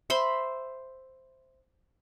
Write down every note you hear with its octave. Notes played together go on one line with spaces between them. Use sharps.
C5 E5 B5 C6